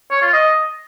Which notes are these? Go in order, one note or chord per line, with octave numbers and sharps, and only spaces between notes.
C#5
F4
D#5